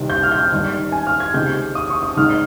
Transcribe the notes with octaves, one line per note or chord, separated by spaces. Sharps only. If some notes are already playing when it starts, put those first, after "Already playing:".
Already playing: C2 C3 D#3
G6
F6
G6
F6
G#1 G2 D#3
G#5
F6
G#6
C#2 C3 D#3 G6
D#6
C#6
D#6
G#1 G#2 D#3 F6